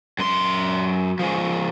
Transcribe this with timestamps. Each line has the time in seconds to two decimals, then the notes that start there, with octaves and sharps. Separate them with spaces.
0.19 F#2 C6
1.19 F3 G#3